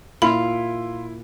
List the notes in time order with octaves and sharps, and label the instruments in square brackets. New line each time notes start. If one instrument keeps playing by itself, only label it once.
[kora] A#2 [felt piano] E4 [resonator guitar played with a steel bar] F4 [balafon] B5